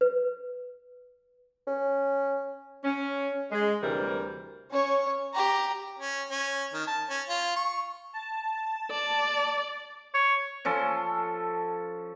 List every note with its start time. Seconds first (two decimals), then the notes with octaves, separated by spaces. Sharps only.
0.01 B4
1.67 C#4
2.84 C#4
3.51 G#3
3.83 D2 C3 E3 G3 A#4
4.71 C#4 C#5
5.34 G4 A#5
5.99 C#4
6.31 C#4
6.74 D#3
6.87 A5
7.09 C#4
7.28 F4
7.56 C#6
8.13 A5
8.91 D5
10.14 C#5
10.65 F3 C#4 A4 C6